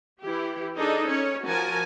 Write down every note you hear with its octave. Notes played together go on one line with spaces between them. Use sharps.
E3 E4 G4
D4 D#4 G#4 A4 D#5
C#4 C#5
F3 F#4 A#4 G#5 A5